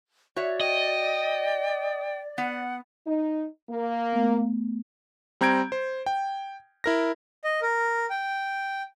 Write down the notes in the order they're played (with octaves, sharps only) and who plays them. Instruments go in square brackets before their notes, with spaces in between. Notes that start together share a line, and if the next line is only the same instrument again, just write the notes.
[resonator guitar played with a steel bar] F#4 C#5 E5 [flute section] D5
[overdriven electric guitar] D#5 [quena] G5
[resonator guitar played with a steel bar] B3 [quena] F#5
[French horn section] D#4
A#3
[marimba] A3 B3
[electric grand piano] G3 C4 A#5 G6 G#6 D7
C5
G5
E4 A#4 A#6
[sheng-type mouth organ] D#5
A#4
G5